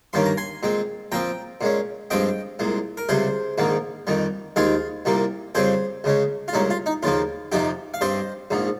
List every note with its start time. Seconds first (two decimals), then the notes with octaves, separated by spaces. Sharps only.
0.13 G2 D#3 A#3 C#4 C6
0.26 A#5
0.37 G#5 C6
0.63 A#2 G#3 C4
1.12 A#2 F3 C4 G5 A#5
1.61 A#2 G#3 C#4
2.10 G2 F3 G#3 C4 D#5 G5
2.59 C2 A#2 G#3
2.97 A#4
3.09 C#2 C3 G3 G#4 C5
3.58 A#1 G#2 D#3 A#3
4.07 F2 D#3 G3
4.56 D#2 D#3 G#3 C4 F4 G#4
5.05 C2 A#2 G3 A#3
5.55 F2 C#3 G3 C4 G#4 C5
6.04 C#2 C#3 G#3 C#4
6.48 F4
6.53 C2 A#2 G#3 C#4 D#4
6.70 F4
6.86 D#4
7.03 D#2 C#3 F3 A#3 F4
7.52 F2 C3 F3 D#4 G4
7.94 F5
8.01 G2 G3 C4 C5 D#5
8.51 A#1 G#2 F3